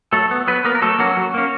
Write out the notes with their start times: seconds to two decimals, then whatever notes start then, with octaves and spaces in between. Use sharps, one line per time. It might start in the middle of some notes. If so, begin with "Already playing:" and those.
0.13 F#3 A3 A4
0.31 B3
0.47 F#3 B3 B4
0.64 A#3 B3 A#4
0.75 A#4
0.82 F#3 A3 A4
0.99 F#3 A#3 C#4 F#4
1.17 F#3
1.34 A#3 C#4